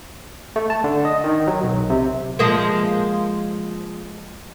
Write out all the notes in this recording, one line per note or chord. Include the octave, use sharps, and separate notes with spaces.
A3
A5
D3
D#5
D#3
F#3
B1
C3
F3 G#3 A#3